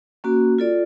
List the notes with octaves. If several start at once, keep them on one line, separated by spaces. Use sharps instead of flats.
A#3 C#4 F#4
F4 A4 D5